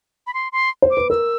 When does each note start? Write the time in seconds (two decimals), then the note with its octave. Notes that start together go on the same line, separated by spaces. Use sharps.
0.27 B5
0.34 C6
0.52 C6
0.82 C5
0.90 D6
0.97 B4
1.10 A#4 E6